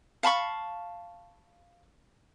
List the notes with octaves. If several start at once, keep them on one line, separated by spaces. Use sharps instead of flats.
F5 A5 B5 C#6